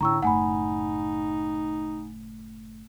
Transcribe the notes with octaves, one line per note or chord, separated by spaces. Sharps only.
A2 D3 C#4 A#5 C#6 E6
F#1 A2 D#4 F#5 G#5 B5